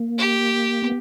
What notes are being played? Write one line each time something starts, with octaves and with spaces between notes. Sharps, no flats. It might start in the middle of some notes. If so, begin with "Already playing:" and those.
Already playing: A#3
G4
B3